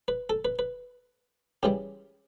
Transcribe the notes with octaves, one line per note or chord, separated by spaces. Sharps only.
B4
A4
B4
B4
C#3 E3 G3 G4